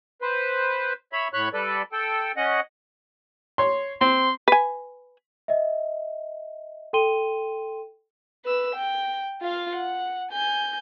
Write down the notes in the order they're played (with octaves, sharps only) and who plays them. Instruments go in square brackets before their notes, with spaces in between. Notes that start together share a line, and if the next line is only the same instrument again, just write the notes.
[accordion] B4 C5
C#5 E5 B5
A2 C#5 B5 C#6 F#6
G3 A4 B4 D5
A4 G5
C#4 D#5 F#5
[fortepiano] C#5 C6
[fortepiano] C4 [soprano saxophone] C6
[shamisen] B4 G#5
[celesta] D#5 E5
A4 G5 C6 D#7 G7
[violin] B4 E6
G5
F4 F5
F#5
G#5 G6